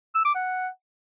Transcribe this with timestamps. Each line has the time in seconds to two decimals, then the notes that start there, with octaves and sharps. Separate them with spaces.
0.15 E6
0.25 D6
0.35 F#5